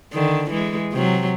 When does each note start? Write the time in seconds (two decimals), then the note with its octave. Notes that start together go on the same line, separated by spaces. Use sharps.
0.13 D3 D#3
0.51 E3 G#3
0.93 C3 F#3